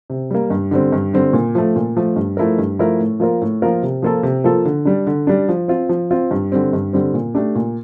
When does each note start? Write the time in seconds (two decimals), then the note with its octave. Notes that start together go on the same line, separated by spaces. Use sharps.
0.10 C3
0.30 G3 A#3
0.50 G2
0.71 D3 G3 C4
0.92 G2
1.14 D3 G3 C4
1.33 A#2
1.55 F3 A3
1.76 A#2
1.97 F3 A3
2.16 G2
2.37 F3 A3 E4 A#4
2.58 G2
2.79 F3 A3 E4 A#4
3.00 A2
3.20 F3 A#3 F4 A#4
3.42 A2
3.62 F3 A#3 F4 A#4
3.83 C3
4.02 F3 A#3 F4 A4
4.23 C3
4.44 F3 A#3 F4 A4
4.65 D3
4.85 G3 D4
5.07 D3
5.27 G3 D4
5.49 F3
5.68 C4 F4
5.89 F3
6.11 C4 F4
6.31 G2
6.52 D3 G3 C4
6.73 G2
6.93 D3 G3 C4
7.14 A#2
7.34 A3 D4 G4
7.55 A#2